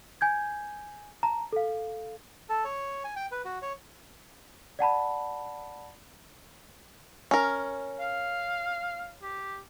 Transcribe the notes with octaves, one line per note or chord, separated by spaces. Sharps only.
G#5 G6 G#6
A5 A#5
A4 F5
A4
C#5
G#5
G5
B4
F#4
C#5
D5 F#5 A5 B5
C#4 A#4
F5
G4